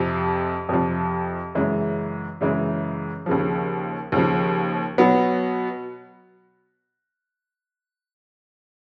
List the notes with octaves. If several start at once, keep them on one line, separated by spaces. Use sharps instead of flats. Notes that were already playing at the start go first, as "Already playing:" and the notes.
Already playing: F2 C3 F3
F2 C3 F3
F#2 C#3 E3 G#3
F#2 C#3 E3 G#3
D#2 C#3 F3
D#2 C#3 F3
B2 F#3 B3